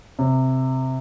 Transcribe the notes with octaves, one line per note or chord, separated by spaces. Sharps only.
C3